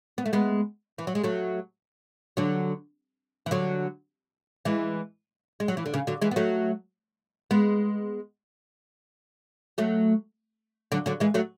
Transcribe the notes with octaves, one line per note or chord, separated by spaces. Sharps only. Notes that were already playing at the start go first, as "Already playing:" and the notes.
B3
A3
G#3 B3
E3
F#3
G#3
F#3 A3
D3 F#3
E3
D3 F#3
E3 G#3
G#3
F#3
E3
D3
C#3
D3 F#3
E3 G#3
B3
F#3 A3
G#3 B3
F#3 A3
D3 F#3
D3 F#3
E3 G#3
F#3 A3